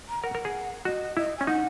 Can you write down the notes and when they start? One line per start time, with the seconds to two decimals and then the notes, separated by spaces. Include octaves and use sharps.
0.09 A#5
0.24 A#4 F#5
0.35 A#4
0.45 G#4
0.85 F#4 D#5
1.16 E4 D#5
1.37 C#4 G#5
1.47 D#4 F#5